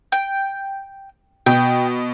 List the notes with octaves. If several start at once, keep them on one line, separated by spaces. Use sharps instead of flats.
G5
B2 G5